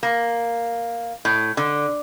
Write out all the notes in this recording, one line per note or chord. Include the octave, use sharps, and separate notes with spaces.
A#3
A2
D3